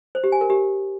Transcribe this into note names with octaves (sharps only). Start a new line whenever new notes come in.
C5
G4
G#5
A#4
G4